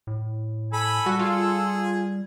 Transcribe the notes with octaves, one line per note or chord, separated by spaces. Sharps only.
A2
A4 G#5 B5
G3 F#4
F4 G#4